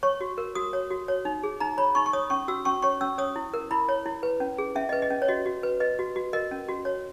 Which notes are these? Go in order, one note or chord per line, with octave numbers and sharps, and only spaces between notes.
C#5 C#6
F#4
A#4
F#4 D#6
C#5
F#4
C#5
D#4
G#4
D#4 A#5
C#5 B5
D#4 C#6
C#6
C#5 D#6
C#4 C#6
F#4 E6
C#4 C#6
C#5 C#6
C#4 E6
C#5 D#6
E4
A#4
E4 B5
C#5
E4
B4
C#4
G#4
C#4 E5
B4 D#5
D#5
C#4
C#5
F#4 D#5
F#4
B4
B4 D#5
F#4
F#4
A#4 D#5
C#4
F#4
C#5